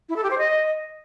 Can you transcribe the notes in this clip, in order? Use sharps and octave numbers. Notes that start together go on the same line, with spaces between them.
E4
A4
G4
C5
D#5